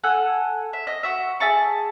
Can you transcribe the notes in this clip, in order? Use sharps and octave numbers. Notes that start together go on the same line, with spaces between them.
A4 F#5 G#5
E5
D#5
F#4 E5
G#4 E5 A5 C#6